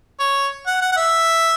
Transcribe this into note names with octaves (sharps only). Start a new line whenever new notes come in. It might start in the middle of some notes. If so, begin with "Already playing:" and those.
C#5
F#5
F#5
F#5
E5